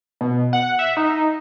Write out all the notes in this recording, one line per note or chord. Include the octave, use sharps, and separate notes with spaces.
B2
F#5
E5
D#4